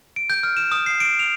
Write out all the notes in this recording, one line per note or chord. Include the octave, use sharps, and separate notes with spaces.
D7
G6
F6
E7
D#6
C7
D7
F7